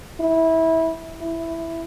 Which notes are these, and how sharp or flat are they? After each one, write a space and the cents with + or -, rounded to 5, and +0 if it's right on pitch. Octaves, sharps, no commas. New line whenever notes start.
E4 -20
E4 +5